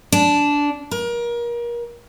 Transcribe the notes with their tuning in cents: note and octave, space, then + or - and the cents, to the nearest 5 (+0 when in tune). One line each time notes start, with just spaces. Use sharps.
D4 -15
A#4 +30